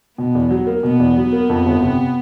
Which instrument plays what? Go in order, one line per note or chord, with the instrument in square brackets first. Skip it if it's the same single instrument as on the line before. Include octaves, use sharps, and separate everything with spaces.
[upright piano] B2 [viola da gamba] B3
[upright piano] E2
F#3
A#3
[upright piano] B2 [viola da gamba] B3
[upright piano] E2
F#3
A#3
F2
G1
C3